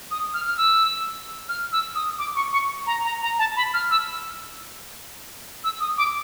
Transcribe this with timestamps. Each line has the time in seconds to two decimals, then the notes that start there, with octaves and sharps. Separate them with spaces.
0.11 D#6
0.34 F6
0.46 F6
0.57 E6
1.49 F6
1.72 E6
1.95 D#6
2.19 D6
2.36 C#6
2.53 C#6
2.87 A#5
3.04 A#5
3.22 A#5
3.39 A5
3.57 B5
3.74 F6
3.91 E6
5.64 E6
5.80 D#6
5.98 D6